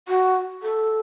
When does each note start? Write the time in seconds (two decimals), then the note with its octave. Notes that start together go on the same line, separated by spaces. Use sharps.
0.08 F#4
0.62 A4